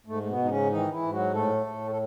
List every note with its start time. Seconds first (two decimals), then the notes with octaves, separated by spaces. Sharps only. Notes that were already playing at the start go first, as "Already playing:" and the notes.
0.06 G#2 A3
0.23 A3
0.28 B2 B3
0.38 G#2
0.45 D#4
0.49 C#3 C#4
0.70 D#3 E3 D#4
0.91 E3 E4
1.02 G#2
1.12 F#3 F#4
1.33 A2 A3 A4
1.66 A2
1.91 A4